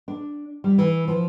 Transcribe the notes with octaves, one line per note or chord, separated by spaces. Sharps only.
D4
G3
E3
F3